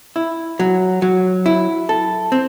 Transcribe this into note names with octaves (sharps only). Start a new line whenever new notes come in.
E4
F#3
F#3
E4
A4
C4